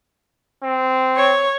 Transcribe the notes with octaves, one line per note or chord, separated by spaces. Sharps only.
C4
C#5